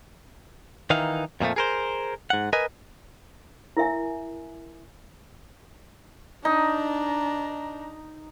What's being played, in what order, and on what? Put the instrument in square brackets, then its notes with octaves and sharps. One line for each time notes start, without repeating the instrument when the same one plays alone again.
[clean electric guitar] D#3 E3 D#4 F5
F2 A#2 F3 A3
G#4 A#4 C5
G#2 F#5
A#4 B4 D#5 G#5
[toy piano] E4 A#4 E5 G#5
[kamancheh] D4 A#5 [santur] D#4